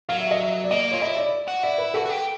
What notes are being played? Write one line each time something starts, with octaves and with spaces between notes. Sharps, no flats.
F#3 F5
E5
D#5
E5
D5
A#3 D#5
F4 C#5
E4 D#5
D5
F#4
E4 D5
B4
F#4 A4
F#4
G4